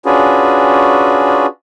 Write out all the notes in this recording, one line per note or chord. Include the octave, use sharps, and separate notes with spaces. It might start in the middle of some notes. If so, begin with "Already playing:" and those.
C#4 D4 F4 F#4 G#4 B4